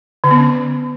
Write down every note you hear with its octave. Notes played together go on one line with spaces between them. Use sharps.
D3
B3
C#4